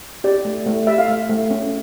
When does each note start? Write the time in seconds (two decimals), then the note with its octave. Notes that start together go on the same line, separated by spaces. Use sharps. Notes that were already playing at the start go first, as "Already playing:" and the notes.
0.24 G4 D5
0.45 A3
0.66 A3
0.87 G4 E5
0.98 F5
1.08 A3
1.30 A3
1.51 C#4